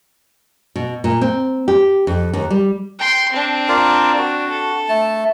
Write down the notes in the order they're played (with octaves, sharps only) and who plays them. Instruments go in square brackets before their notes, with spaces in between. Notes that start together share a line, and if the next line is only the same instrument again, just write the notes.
[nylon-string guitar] B2
A#2
C4
G4
F2
D#2
G3
[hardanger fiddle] G5 C6
C4 D4
[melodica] F4 A#4 D5
F#4
[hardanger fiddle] A4
[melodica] A3 A5